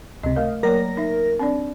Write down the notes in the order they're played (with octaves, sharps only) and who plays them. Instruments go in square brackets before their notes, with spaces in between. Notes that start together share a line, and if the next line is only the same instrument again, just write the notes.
[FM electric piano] C#2 C3 [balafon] D#5
[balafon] A3 A#4 [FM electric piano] D#5 F5
[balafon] F#3 A#3 C#5 [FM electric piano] A#4 A#6
[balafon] D#4 E5
C4 D4 D5